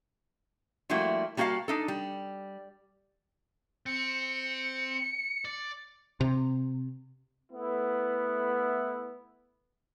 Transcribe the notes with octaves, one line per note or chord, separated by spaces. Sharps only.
F3 G3 A3 A#3 E4 F#4
G3 A#3 F#4 C#5 F5 A5
D4 D#4 A4
G3
C4 C#7
D5
C3
A3 B3 E4